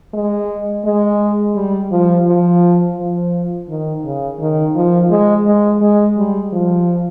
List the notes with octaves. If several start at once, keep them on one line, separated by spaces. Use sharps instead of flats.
G#3
G#3
G3
F3
F3
F3
D#3
C#3
D#3
F3
G#3
G#3
G#3
G3
F3